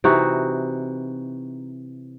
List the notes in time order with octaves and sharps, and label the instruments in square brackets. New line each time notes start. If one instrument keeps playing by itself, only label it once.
[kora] C3 E3 D#4 F#4